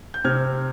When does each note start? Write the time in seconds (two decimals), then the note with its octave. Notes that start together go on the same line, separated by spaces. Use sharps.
0.14 G6
0.24 C3 F6 G#6